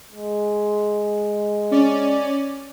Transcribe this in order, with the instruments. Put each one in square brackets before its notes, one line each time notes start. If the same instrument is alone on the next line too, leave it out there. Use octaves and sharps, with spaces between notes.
[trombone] G#3
[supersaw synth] C#4 D5